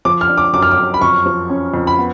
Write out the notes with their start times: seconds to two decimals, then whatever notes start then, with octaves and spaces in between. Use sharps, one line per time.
0.05 F3 D6
0.21 F6
0.29 D4
0.38 D6
0.53 F#2 D6
0.62 F6
0.71 D6
0.78 F#2
0.94 B5
1.01 F2 C#6
1.26 F3
1.50 C#4
1.74 F2
1.87 B5
1.98 B3